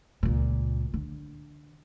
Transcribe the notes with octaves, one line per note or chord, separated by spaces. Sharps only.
C#2 A#2
D3